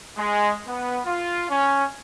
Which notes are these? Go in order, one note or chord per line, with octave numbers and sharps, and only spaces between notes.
G#3
B3
F4
C#4